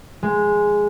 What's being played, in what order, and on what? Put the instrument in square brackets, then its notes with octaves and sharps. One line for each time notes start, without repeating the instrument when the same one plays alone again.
[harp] G#3